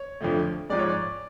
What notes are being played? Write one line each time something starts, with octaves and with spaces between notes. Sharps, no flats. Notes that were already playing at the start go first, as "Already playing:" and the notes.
Already playing: C#5
F2 D3 F3 A3
G#2 F3 G#3 D5
C#5
D5